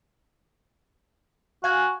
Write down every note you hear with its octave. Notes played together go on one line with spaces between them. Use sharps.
F#4 F5 G#5